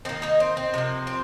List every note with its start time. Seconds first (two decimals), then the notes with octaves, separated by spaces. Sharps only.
0.05 D#3 A#3 C4
0.22 A#3 D#4
0.40 C4
0.57 C4
0.74 C3 F3 A#3
1.07 C4